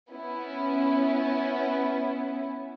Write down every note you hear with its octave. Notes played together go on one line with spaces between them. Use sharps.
B3 C#4 E4